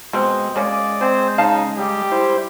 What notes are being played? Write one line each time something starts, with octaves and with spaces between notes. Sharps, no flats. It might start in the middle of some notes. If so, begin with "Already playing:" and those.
B2 G#3 C4
G#3 A#3 C#4 D5
C4 G#4 C5
C#3 D#4 F5 A5
G3 G4
E4 C5